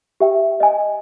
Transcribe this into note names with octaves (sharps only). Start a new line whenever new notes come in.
G4 E5 G5
D#5 G#5